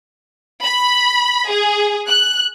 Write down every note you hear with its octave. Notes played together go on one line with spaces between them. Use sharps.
B5
G#4
F#6